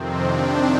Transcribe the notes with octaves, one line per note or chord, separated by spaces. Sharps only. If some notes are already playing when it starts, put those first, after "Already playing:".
Already playing: F2 C3 D#3 C4
D4